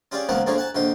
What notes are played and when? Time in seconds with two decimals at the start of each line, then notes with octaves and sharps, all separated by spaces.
0.12 C#4 F4 G4 G#4 D5
0.29 C#2 D#3 F3 A#3 B3 F#5
0.46 A2 D3 F3 A#3 G#4 C#5
0.58 F#5 G#5 A5
0.75 A#1 D3 D#3 C5